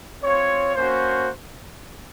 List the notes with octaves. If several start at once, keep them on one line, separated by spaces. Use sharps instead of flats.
C4 F4 C#5
A#3 C#4 F#4 C5